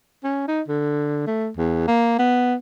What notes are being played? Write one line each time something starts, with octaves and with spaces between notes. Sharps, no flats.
C#4
D#4
D3
A3
E2
A#3
B3